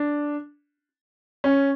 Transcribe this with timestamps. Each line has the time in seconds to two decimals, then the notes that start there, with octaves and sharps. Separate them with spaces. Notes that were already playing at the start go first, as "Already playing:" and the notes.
Already playing: D4
1.44 C#4